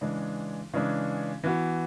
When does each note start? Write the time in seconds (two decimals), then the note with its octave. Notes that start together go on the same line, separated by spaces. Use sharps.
0.01 C#3 E3 G#3 D4
0.74 C#3 E3 G#3 D4
1.44 E3 B3 F#4